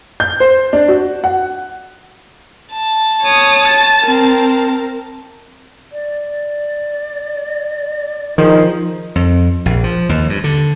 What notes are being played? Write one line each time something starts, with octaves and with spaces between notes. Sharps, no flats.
G6
C5
D4
F#4
F#5
A5
C#5 D#6
A6
C4 A#4
D5
D#3 F3 D#4 G#4
F2
A#1
F3
D#2
G2
D3